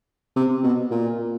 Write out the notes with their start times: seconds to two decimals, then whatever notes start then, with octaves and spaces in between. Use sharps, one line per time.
0.36 C3
0.64 B2
0.91 A#2